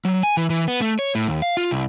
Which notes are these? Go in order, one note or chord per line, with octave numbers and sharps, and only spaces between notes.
F#3
G#5
E3
E3
B3
A3
C#5
A2
D#2
F5
F4
C2